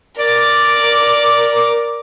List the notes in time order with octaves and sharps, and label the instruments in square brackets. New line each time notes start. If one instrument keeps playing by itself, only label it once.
[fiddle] A#4 D6 [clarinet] D5